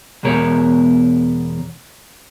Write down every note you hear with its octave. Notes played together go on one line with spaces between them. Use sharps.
E2 B2 G#3 A#4 C#5